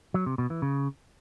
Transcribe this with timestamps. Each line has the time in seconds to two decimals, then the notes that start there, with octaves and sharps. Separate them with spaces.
0.14 F#3
0.26 C3
0.38 B2
0.50 E3
0.62 C#3